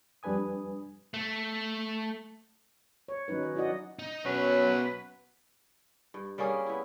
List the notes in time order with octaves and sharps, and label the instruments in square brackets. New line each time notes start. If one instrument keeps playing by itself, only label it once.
[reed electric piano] F2 G3 D4 B4 G#5 D#6
[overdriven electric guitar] A3
[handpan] C#5
D#3 F#3 C#4 D#4 B4
C#5
E4 F#4 D5 D#5 F#5
[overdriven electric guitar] D#4
[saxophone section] F#2 F#3 [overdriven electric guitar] B2 C#5 [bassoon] C#4 [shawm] B4
[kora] G2
G3 A#3 C#4 G#4
B3 E4